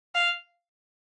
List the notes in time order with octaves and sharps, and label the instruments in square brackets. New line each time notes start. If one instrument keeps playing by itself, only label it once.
[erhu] F5